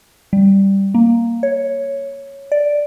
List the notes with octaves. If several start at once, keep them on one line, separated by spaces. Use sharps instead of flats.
G3
A#3
C#5
D5